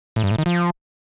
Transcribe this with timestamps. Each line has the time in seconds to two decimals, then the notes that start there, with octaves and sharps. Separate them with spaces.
0.16 A2
0.24 G2
0.31 A2
0.38 D#3
0.46 F3